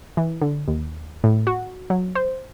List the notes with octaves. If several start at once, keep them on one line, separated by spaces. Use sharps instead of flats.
E3
D3
D#2
A2
F#4
F#3
C5